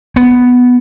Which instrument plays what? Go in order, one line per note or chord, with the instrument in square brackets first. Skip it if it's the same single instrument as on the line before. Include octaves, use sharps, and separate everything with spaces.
[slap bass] B3